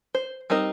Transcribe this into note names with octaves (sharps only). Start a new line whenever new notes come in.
C5
G3 C4 D#4 A#4